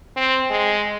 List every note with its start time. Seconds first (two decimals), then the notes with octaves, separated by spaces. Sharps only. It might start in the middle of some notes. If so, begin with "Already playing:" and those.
0.17 C4
0.50 G#3